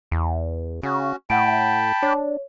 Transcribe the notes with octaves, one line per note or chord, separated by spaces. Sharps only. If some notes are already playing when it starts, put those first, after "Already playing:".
E2
C#3 C#4 F#4
A2 F#5 G5 A5 B5 D7
D4 C#5